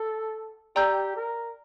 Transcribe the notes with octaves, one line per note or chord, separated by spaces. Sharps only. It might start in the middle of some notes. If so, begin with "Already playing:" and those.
Already playing: A4
G4 D5 G5 A#5 E6 G6
A#4